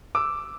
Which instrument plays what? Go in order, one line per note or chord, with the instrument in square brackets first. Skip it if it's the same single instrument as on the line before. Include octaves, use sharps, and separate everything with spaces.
[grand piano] D6 E6